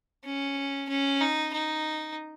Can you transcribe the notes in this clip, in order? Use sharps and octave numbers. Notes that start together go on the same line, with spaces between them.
C#4
C#4
D#4
D#4